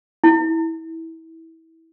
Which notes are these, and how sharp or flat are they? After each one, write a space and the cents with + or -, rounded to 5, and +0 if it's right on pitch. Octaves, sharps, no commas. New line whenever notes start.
E4 -20